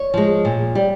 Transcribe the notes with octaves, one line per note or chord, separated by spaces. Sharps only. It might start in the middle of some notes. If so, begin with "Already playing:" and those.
Already playing: C#5
F3 G#3
A#2
G3